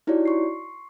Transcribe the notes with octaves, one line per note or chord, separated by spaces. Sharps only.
D#4 E4 F#4 G4 C#5 D5
C6 C#6 C7